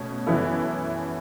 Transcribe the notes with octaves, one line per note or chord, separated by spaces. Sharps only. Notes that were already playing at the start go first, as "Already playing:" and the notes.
Already playing: B2 A3 C#4
F#2 E3 B3 E4 A4